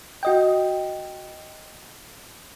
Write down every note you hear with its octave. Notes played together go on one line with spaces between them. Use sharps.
F#4 D#5 G5